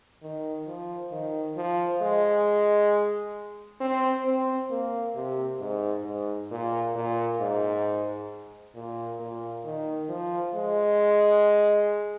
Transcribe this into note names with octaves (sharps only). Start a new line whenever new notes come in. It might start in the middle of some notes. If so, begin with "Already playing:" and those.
D#3
F3
D#3
F3
G#3
C4
C4
A#3
C3
G#2
G#2
A#2
A#2
G#2
A#2
A#2
D#3
F3
G#3